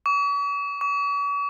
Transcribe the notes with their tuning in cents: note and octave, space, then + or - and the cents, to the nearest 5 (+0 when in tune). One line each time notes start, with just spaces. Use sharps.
C#6 +45
C#6 +45